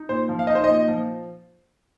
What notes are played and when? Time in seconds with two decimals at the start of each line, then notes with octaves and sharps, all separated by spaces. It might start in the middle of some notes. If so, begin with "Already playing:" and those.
Already playing: D#4
0.09 A#2 C5
0.29 F3
0.39 F5
0.47 D#4 D#5
0.55 C5
0.64 A#2 D#5
0.88 F3